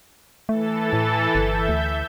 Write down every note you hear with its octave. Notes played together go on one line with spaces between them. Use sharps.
E3 A3 A4 A6
A2
G1 E5 G6
D2